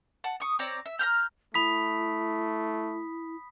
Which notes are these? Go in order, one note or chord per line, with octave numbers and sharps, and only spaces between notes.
F#5 A5
C#6 D#6
C4 C#5 D5 A#5
E5
A#5 B5 F6 G6
A3 E4 B5 D#6 B6